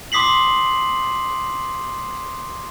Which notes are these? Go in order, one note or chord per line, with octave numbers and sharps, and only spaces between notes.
C6 D6 D#6 B6 C7 F#7